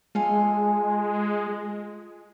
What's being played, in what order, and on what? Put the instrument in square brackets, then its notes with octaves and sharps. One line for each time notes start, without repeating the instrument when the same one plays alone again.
[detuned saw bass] G#3 [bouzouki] F4 A4 G#5